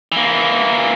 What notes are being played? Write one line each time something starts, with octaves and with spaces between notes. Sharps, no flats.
E3 A#3